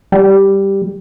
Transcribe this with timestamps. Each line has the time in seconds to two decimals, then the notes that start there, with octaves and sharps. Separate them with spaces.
0.12 G3